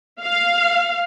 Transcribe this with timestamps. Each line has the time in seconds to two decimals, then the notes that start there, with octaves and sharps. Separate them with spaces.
0.22 F5